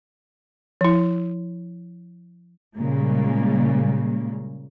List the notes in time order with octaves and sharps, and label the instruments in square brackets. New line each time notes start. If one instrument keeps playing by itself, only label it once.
[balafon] F3 E4
[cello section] A#2 C#3 G3 G#3 A#3